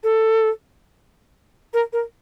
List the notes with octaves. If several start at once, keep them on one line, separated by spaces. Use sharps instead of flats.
A4
A#4
A#4